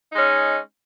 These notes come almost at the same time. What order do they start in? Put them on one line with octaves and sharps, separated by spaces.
D#4 G#3 C#4